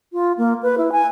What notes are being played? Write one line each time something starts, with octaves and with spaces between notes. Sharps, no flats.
F4
A#3
B4
E4
G#5